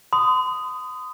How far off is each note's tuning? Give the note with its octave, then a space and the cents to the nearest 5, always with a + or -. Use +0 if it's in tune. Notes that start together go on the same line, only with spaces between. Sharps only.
C6 -45 D#6 +0